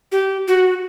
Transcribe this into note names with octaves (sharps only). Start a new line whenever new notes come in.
G4
F#4